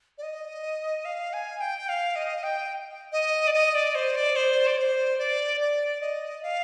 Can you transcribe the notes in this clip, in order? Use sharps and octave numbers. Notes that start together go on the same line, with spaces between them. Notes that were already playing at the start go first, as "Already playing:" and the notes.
D5
D#5
F5
G#5
G5
F5
D#5
G5
D#5
D5
D#5
D5
C5
D5
C5
D5
C5
D5
D5
D#5
F5